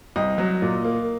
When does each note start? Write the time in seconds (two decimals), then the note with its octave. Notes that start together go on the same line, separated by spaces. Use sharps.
0.16 C2 D#5
0.38 F#3
0.62 A#2
0.84 A#3